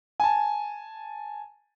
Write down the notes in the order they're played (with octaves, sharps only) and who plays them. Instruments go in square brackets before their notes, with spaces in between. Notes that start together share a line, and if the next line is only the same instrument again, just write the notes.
[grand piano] G#5 A5